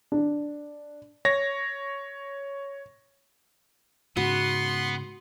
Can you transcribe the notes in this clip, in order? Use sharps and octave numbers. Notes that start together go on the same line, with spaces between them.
D4
C#5 A#6
G#2 C#3 B3 F#4 C6